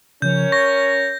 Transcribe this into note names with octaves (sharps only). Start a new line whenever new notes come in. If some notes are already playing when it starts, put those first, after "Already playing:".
C#3 F3 C#4 A#4 C#5 G6
C#6 A#6